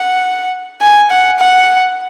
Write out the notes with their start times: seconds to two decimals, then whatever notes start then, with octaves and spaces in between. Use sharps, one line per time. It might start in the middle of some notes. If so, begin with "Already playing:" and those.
Already playing: F#5
0.81 G#5
1.10 F#5
1.39 F#5